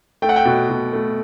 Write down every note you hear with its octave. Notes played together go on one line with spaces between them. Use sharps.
A3 G5
F#5
G5
B2
B2
A3